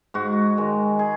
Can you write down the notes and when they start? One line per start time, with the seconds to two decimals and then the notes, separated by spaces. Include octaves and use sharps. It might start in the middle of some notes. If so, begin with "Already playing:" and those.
0.14 G#2 F#4
0.57 D#3 G#3
0.99 G#4